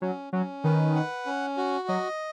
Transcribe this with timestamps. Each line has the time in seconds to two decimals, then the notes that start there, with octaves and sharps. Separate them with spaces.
0.02 F#3 C#4
0.33 F#3 C#4
0.64 D#3 B4
0.95 F#5
1.26 C#4
1.57 F#4
1.88 F#3 D#5